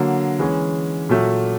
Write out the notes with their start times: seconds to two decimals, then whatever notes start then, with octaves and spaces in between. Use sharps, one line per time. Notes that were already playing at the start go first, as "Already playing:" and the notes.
Already playing: D3 F#3 A#3
0.39 E3 G#3 C#4
1.09 A#2 F#3 A3